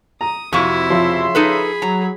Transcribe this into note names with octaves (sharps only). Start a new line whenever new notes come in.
A#5 D#6
F2 C3 E4 F#4 C#6
C#3 F3 E5 C6
D#4 G#4 A4 B4 B5
F#3 A#5